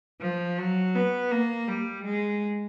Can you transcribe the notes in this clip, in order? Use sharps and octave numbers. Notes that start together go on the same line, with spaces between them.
F3
F#3
B3
A#3
G3
G#3